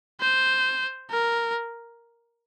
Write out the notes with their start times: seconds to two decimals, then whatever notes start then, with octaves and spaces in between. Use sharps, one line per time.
0.21 C5
1.11 A#4